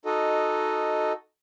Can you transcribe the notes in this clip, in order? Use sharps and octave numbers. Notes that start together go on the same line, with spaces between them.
D#4 F#4 A4 D#5